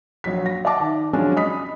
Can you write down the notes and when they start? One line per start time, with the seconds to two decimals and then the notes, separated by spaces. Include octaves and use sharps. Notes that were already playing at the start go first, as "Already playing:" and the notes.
0.24 A#1 F#3 B6
0.46 A#6
0.65 D5 E5 F#5 A5 D6
0.80 D#3
1.13 F3 F#3 G#3 C#4 D4
1.36 D#5 B5 D#6 B6